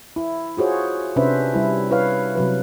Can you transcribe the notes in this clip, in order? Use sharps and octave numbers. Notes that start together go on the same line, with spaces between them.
E4
F4 F#4 G#4 C5 C#5
C3 C#4 D4 B4 C5 E5
G3 E4
E4 B4 C#5 F5
C3 F#3 B4